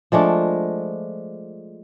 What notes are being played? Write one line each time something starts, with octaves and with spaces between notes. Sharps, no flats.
F3 G#3 A3 D4